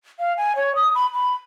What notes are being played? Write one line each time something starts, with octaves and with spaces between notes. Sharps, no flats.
F5
G#5
C#5
D#6
B5
B5